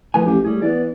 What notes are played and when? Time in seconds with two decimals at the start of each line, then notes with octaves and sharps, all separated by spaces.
0.14 A2 F3 B4 G#5
0.26 A1 G4
0.45 A2 G3 G#4
0.62 E3 B3 D5